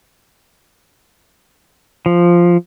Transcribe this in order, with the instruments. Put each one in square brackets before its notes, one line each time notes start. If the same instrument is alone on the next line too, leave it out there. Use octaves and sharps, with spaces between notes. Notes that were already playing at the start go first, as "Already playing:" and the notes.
[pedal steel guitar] F3